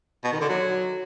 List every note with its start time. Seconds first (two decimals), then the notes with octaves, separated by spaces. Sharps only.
0.24 B2
0.32 D#3
0.41 D3
0.49 F#3